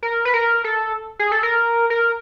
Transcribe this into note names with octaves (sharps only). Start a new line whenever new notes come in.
A#4
B4
A#4
A4
G#4
A4
A#4
A#4